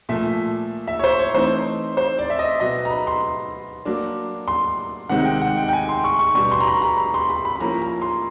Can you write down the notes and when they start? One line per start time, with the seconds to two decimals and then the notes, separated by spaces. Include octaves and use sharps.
0.09 A#2 F3 A3 E5
0.88 E5
0.99 C#5
1.04 C5
1.19 C#5
1.34 E3 A3 C4 D#4 C5
1.97 C5
2.18 D5
2.30 E5
2.39 D#5
2.60 B2 F#3 B3 D#5
2.85 A#5
2.91 B5
3.07 C6
3.85 F#3 A#3 D4
4.48 C6
5.09 C3 D#3 G#3 C4 D#4 F#5
5.25 G5
5.42 F#5
5.57 G5
5.68 G5
5.73 G#5
5.89 C6
6.04 C#6
6.19 C#6
6.35 B2 G3 B3 D4 C#6
6.51 C6
6.60 A#5
6.67 B5
6.77 B5
6.82 A#5
6.97 B5
7.14 C6
7.29 B5
7.45 B5
7.56 B5
7.60 F3 A#3 C#4 E4 A#5
7.82 A#5
8.02 C6